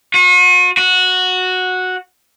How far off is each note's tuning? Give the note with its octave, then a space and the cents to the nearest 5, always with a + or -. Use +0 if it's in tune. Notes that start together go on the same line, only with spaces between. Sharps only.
F#4 -45
F#4 -10